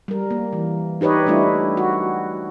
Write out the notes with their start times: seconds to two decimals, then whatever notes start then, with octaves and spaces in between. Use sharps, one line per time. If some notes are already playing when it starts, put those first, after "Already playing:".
0.08 G3 A#4
0.31 A#3
0.53 E3
1.01 D#4 G4 B4 C#5 D#5
1.27 G3 A3 D4 E4 F4
1.77 F#4